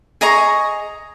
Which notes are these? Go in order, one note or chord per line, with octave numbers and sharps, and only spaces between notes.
G#4 D#5 A#5 C#6